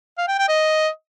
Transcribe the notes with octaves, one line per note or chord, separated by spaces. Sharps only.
F5
G5
G5
D#5